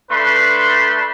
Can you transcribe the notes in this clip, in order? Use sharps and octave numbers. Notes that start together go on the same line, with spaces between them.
A3 D4 B4 B5 C6